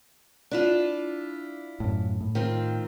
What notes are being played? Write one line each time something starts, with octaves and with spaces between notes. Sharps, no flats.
D4 E4 F4
F#2 A2
A2
D#3 C4 F4